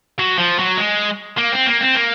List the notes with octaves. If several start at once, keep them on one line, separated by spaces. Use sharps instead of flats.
F#3
F3
F#3
G#3
A#3
C4
A#3
C4
A#3